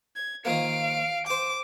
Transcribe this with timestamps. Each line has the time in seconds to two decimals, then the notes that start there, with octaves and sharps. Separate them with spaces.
0.16 G#6
0.45 D#3 F3 A#3 F5 D7
1.26 C5 G5 D6